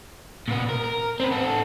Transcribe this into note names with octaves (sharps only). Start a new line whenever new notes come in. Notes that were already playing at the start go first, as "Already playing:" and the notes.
A#2 B3
A#4
A#4
C4 B4
B3 A4